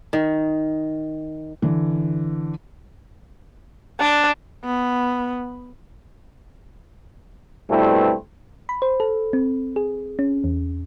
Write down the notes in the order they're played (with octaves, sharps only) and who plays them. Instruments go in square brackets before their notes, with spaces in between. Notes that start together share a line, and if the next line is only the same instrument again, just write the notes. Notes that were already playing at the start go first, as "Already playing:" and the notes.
[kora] D#3
[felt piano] D3 E3
[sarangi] D4
B3
[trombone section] G2 B2 A3 C4 E4
[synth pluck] B5
C5
A4
C4
G#4
C#4
E2